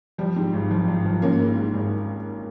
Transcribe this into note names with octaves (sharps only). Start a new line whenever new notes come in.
F3 G3
G#2
G#1
F3
G#1
F3
G#1 A#3 C#4
G#2
G#2
G#1